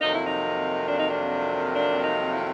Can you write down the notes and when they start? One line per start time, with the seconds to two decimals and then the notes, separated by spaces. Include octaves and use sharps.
0.01 F2 C3 D#3 F#3 A#3 D#4
0.13 E4
0.26 D#4
0.88 D4
0.99 D#4
1.10 D4
1.75 D4
2.04 D#4
2.32 E4